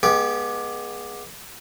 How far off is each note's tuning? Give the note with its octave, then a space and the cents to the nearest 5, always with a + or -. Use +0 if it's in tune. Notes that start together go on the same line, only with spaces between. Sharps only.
G#3 +0 B3 -30 G4 +0